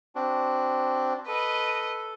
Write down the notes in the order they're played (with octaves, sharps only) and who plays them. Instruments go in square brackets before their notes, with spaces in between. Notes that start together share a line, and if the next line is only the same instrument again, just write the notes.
[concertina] C4 D4 F#4
[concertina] A4 [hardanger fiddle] B4 D#5